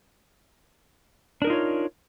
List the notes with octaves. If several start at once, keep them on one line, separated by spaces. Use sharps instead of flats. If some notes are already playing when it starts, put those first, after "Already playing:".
D4 D#4 F4 A#4 C#5